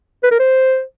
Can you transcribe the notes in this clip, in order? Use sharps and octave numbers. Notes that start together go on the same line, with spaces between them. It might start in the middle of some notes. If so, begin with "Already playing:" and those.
B4
A#4
C5